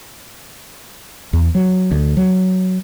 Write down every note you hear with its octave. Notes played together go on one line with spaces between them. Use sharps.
E2
F#3
D2
F#3